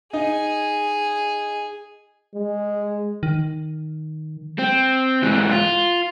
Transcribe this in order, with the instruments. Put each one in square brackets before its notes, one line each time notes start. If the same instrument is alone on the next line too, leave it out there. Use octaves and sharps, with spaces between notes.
[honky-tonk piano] D#4 [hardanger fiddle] G#4
[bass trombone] G#3
[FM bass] D#3
[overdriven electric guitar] C4
G#2 E3
F4